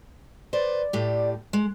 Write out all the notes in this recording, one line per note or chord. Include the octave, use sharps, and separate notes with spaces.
B4 C5 D5
A2 G4
G#3